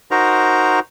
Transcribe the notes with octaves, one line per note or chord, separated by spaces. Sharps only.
D#4 F#4 A#4 C5 A#5